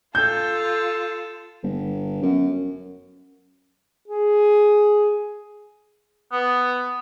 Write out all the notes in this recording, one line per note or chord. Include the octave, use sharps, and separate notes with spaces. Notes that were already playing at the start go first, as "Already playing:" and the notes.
F4 A4 G6
G1
F#2
G#4
B3